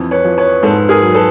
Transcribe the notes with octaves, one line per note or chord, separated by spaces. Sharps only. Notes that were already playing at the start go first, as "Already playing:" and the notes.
Already playing: F2 E3
B4 C#5
F3
B4 C#5
G#2 A4 B4
G#4 A#4
F#3
A4 B4